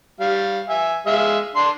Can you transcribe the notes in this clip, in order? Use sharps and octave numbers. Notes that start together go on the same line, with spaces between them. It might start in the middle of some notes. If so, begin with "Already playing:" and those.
G3 F5
E5 G#5
G#3 E5 F5
D4 C6